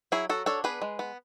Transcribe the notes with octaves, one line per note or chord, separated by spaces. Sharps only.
F#3 E4 G#4
F#3 F#4 A4
D4 A4 C#5
B3 G#4 B4
G#3
B3